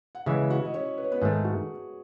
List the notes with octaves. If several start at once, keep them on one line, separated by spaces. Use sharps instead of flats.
F#5
C#3 E3 G#3 E4 E5
F#4 F#5
D#5
C#4 C#5
B4
C#5
B3 B4
G#2 D#3 A3 G#4
F#4